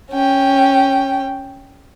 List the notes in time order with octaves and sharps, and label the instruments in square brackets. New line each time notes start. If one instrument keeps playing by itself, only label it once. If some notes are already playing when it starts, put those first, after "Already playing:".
[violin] C#4 G5